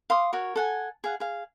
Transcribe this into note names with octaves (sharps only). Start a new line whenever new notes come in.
F5 C6 D6 D#6
F#4 A#4 C#5
A4 F#5 G#5
G#4 F5 F#5
G#4 F5